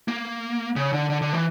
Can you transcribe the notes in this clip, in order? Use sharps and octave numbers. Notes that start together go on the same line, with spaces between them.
A#3
C#3
D3
D3
D3
E3